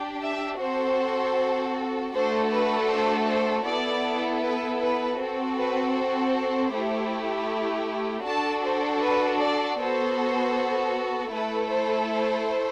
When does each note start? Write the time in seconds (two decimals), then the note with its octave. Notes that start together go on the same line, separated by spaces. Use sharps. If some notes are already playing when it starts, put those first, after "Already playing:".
Already playing: D4 G4
0.22 E5
0.60 C4 F#4 A4 C5
2.13 A3 D4 F#4 A4 C5
2.51 B4
2.90 C5
3.28 C5
3.65 B3 E4 A4 D5
4.43 B4
4.81 B4
5.19 C4 F#4 A4
5.57 B4
5.96 C5
6.72 A3 E4 G4
8.25 D4 F#4 A4 A5
8.63 C5
9.02 B4
9.40 D5
9.78 B3 F#4 A4 C5
11.31 A3 E4 A4 B4
11.70 C5
12.08 C5